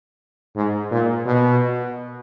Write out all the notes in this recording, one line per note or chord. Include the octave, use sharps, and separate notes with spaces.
G#2
A#2
B2